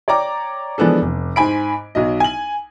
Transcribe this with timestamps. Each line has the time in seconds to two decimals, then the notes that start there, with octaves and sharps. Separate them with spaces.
0.08 C#5 D5 G5 A#5 D6
0.78 E3 F3 G#3 B3 D4 A4
1.02 F1
1.36 G#2 C5 G#5 B5 D7
1.95 B1 F#3 D#5
2.20 G#5 F#7